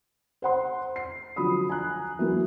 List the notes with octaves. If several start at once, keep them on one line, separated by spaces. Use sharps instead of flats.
C5 F#5 C6
C7
D3 F3 F#3 B5 D#6
G#5 A#5 F#6
E3 F#3 A#3 E4